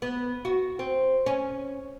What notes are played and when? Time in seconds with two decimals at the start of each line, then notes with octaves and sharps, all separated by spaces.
0.02 B3
0.45 F#4
0.79 C4
1.26 C#4